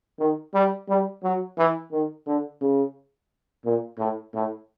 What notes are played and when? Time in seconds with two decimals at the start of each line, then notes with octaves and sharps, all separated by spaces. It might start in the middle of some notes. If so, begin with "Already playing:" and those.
0.19 D#3
0.54 G3
0.88 G3
1.23 F#3
1.58 E3
1.92 D#3
2.26 D3
2.61 C#3
3.64 A#2
3.98 A2
4.34 A2